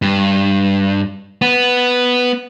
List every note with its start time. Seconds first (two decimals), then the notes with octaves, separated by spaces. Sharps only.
0.02 G2
1.42 B3